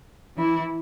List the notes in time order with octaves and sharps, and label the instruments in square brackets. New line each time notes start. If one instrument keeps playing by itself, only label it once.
[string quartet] E3 E4